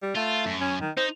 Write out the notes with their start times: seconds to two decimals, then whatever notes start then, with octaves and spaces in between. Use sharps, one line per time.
0.02 G3
0.16 A3 F4
0.46 F#2
0.61 C#4
0.81 D#3
0.97 D#4 C5